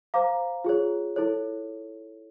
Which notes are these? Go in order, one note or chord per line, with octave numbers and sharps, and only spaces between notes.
C5 F5 A#5 D6
F4 G#4 C#5
E4 A4 C#5